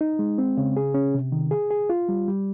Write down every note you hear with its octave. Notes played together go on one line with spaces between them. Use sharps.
D#4
G#3
C4
C#3
G#4
C#4
C3
D#3
G#4
G#4
F4
G3
G3